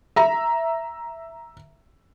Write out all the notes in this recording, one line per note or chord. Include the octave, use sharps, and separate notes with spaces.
E5 A#5